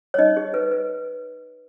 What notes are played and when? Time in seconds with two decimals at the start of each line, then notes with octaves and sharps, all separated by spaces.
0.14 C#5
0.19 D#4 D#5
0.37 G#4
0.54 B4
0.71 B4